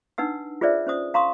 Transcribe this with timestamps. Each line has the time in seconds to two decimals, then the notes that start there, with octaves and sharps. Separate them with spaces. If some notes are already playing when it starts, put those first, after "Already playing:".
0.18 D4 D#4 B4 F#5 E6
0.61 F4 G#4 B4 C5 D5 E5
0.87 C#4 C5 D#6
1.14 F5 A#5 C6 C#6 D#6